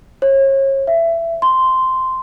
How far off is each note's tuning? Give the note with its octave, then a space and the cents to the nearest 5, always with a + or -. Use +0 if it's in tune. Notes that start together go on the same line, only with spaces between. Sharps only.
C#5 -35
E5 +20
C6 -10